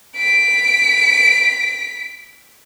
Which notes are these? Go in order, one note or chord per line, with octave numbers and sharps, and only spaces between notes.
B6 D7